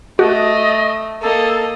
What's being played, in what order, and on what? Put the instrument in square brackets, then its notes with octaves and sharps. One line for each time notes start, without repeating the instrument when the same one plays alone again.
[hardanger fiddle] A3 [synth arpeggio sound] F#4 [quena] D#5
[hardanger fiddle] A#3 D#5 [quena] A4